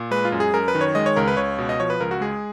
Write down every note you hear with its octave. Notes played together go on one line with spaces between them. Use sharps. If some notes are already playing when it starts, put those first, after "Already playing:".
Already playing: A#2
G#3 B4
F4
F#2
G#4
F#2 A#4
B4
D#3
C#5
G#3 D#5
C#5
C#2 A#4
B4
C#2 C#5
B2
D#5
F3 C#5
B4
C#2 A#4
F#4
G#3 G#4